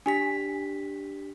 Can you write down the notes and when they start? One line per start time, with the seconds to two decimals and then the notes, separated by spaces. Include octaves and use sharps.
0.06 D4 G4 G#5 B6